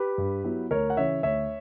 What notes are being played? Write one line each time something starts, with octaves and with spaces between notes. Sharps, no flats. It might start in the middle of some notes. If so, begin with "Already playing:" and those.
Already playing: G4 B4
G2
F#3 B3 E4
D2 A#4 C#5
F#5
C#3 E3 C#5 E5
D2 C#5 E5